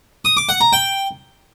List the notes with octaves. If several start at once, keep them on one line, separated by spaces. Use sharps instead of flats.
D#6
D6
F#5
A#5
G5